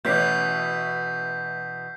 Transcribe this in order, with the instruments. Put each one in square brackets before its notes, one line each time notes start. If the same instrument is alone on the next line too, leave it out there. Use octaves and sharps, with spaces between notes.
[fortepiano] A1 C#4 D6 [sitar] B2 E3 [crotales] G6 B6 C7